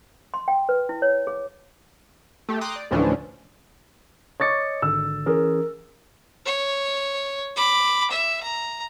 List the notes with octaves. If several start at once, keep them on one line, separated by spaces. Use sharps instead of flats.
C6
G5
B4
E4
C#5
G#4
A3 G4
G5 A#5 C6 D6 D#6 F#6
D5
D2 A2 E3 F3 C#4 D4
C#5 D#5 C#6 D6 A6 C#7
G#1 D3 E6
E3 C#4 G#4 A#4
C#5
B5 D6
E5
A#5